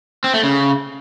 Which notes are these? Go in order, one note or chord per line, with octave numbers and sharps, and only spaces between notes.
C4
A3
C#3